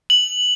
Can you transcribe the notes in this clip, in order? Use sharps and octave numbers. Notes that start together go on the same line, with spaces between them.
F#7